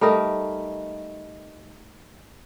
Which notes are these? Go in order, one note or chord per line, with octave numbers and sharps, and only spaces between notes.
G3 A3 D#4 A#4